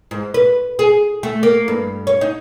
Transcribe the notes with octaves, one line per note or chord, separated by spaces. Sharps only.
G#2
B4
G#4
A3
A#3
G2
C#5
D#4